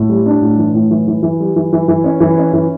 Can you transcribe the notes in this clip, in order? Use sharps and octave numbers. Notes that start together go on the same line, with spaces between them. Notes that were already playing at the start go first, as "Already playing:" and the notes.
Already playing: A2
G3
D4
A2
E3
A2
E3
E3
E3
G3
E3
E3
E3
C#4
E3
C#4
E3